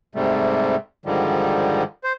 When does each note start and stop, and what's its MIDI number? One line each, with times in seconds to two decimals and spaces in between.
0.15 0.76 44
0.15 0.76 48
0.15 0.76 55
0.15 0.76 57
1.06 1.83 44
1.06 1.83 50
1.06 1.83 51
1.06 1.83 53
1.06 1.83 55
2.04 2.13 72